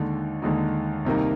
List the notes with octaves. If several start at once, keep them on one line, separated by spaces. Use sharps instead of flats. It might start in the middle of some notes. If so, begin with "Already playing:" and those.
Already playing: D#2 D3 G#3 D#4
D#2 D3 G#3 D#4
C2 C3 D#3 A#3 D#4